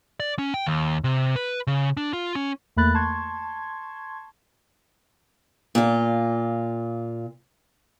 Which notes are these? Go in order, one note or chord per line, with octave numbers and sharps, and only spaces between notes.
D5
C#4
G5
D#2
C3
B4
C#3
D4
F4
C#4
E2 A3 A#3 B5 F#6 A6
A5 C6 C#6 G#6
A#2 F4